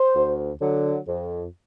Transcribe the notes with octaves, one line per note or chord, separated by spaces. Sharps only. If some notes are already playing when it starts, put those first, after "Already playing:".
Already playing: C5
D2
D3 F#3
F2